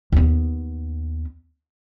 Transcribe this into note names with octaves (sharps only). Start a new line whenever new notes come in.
D#2 B3